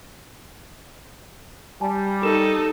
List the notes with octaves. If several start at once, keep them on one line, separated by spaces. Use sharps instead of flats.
G3 G#5 A5
D#4 G4 A4 A#4 E7